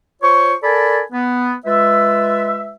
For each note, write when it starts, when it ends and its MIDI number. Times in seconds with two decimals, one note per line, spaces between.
0.22 0.54 65
0.22 0.54 72
0.22 0.54 73
0.22 0.54 85
0.63 1.01 69
0.63 1.01 70
0.63 1.01 74
0.63 1.01 80
0.63 1.01 81
0.63 1.01 83
1.12 1.53 59
1.66 2.75 56
1.66 2.75 65
1.66 2.75 71
1.66 2.75 76